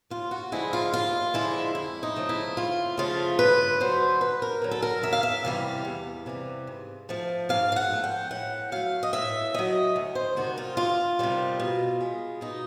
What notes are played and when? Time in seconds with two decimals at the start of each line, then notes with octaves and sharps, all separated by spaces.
0.10 D#2 F4
0.31 F#4
0.52 D3 F3 G#3 E4
0.73 F4
0.93 D#2 F4
1.34 D3 F3 G#3 E4
1.75 F2 E4
2.03 D#4
2.16 C#3 F3 A3
2.29 E4
2.57 F2 F4
2.98 C#3 F3 A3 F4
3.39 G2 B4
3.80 D3 F#3 C5
4.21 G2 B4
4.42 A#4
4.62 D3 F#3
4.71 A4
4.82 A#4
5.03 E2 E5
5.13 F5
5.23 E5
5.44 C3 E3 G3 F5
5.85 E2
6.26 C3 E3 G3
6.67 G#2
7.09 F3 A3
7.49 G#2 F5
7.72 F5
7.76 F#5
7.90 F3 A3
8.04 G5
8.31 A2 F#5
8.72 F#3 A3 F5
9.03 D#5
9.13 A2 E5
9.54 F#3 A3 D#5
9.96 D2
10.15 C5
10.36 C3 D#3 G3 F#4
10.58 F4
10.77 D2 F4
11.19 C3 D#3 G3
11.60 B2
12.01 G#3
12.41 B2 D#4